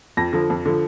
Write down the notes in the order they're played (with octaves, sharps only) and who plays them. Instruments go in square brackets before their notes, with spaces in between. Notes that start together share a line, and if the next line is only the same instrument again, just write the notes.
[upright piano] F2 A#6
D3 F3
F2
D3 F3